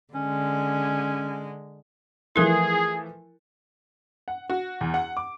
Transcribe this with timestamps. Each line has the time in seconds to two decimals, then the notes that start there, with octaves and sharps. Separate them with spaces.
0.15 D3 G#3 C#4
2.36 E3 F3 A3 E4 G#4 A#4
4.28 F#5
4.50 F#4
4.81 E2
4.94 F#5
5.17 D6